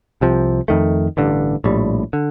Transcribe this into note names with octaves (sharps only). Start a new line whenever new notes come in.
C2 C3 F3
F2 D#3 A3
A1 G2 D3
A#1 A2 G3
D3